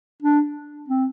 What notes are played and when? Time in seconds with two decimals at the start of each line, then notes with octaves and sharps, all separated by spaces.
0.22 D4
0.88 C4